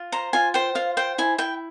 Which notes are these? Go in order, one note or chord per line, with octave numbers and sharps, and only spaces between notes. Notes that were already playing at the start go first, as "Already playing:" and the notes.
Already playing: F4
C5 A#5
F4 G#5
C5 G5
F4 F5
C5 G5
E4 G#5
E4 G5